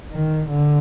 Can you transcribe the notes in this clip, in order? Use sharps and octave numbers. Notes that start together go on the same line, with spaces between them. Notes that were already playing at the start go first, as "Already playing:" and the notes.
D#3
D3